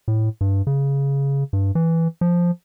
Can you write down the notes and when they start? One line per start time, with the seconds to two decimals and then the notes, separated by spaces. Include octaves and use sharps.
0.08 A2
0.41 G2
0.67 C#3
1.53 G2
1.75 E3
2.21 F3